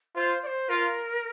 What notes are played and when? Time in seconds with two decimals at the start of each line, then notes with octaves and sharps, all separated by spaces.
0.15 F4 C5
0.43 D5
0.47 C5
0.69 F4 A#4